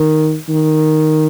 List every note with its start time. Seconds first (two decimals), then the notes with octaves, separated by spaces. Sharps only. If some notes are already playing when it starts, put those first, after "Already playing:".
Already playing: D#3
0.49 D#3